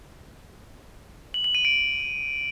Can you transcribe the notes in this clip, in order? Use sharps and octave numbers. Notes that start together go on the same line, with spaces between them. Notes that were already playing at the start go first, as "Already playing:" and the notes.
F#7
F#7
D#7
D7